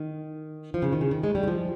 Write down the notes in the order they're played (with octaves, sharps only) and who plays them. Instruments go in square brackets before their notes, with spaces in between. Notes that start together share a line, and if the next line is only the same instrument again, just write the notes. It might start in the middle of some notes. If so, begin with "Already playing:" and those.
Already playing: [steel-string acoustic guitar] D#3
F3
C#3
D#3
C#3
D#3
G#3
G3
D#3
F3